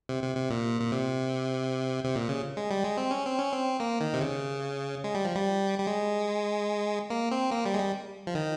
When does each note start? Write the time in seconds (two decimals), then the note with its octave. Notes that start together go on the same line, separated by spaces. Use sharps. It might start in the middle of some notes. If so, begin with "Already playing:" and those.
0.09 C3
0.23 C3
0.37 C3
0.50 A#2
0.81 A#2
0.92 C3
2.04 C3
2.15 A#2
2.29 C#3
2.57 G#3
2.71 G3
2.84 G#3
2.97 C4
3.11 C#4
3.25 C4
3.39 C#4
3.52 C4
3.80 A#3
4.00 D#3
4.14 C3
4.21 C#3
5.04 G#3
5.14 G3
5.24 F3
5.35 G3
5.79 G3
5.87 G#3
7.10 A#3
7.31 C4
7.51 A#3
7.66 G3
7.74 G#3
7.79 G3
8.27 F3
8.35 D#3